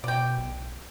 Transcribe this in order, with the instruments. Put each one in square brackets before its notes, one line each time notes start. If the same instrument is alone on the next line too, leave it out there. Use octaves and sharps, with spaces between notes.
[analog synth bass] B2 [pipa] D5 G5
[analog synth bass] B1